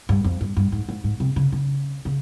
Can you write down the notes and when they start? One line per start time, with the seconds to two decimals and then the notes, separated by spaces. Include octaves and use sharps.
0.09 G2
0.24 F2
0.41 G2
0.57 G2
0.72 G#2
0.89 G#2
1.04 G#2
1.20 C3
1.36 C#3
1.52 C#3
2.05 C#3